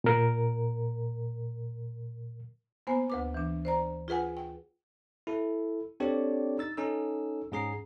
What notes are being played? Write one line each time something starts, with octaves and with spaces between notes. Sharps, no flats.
A#2 A#4
A#3 B3 C5 G#5
D2 B4 D6
E3 D4
C5 D5 A#5
F4 G#4 B4 F#5 G#5
G5
E4 A4
C4 D4 G4 A4 C#5 D5
D#4 E6 A6
C#4 D#4 A4 E6
G#2 C#4 G#4 A#5 C7